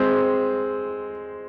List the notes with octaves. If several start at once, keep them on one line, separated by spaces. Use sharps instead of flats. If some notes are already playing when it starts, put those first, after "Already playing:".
Already playing: G#3 C4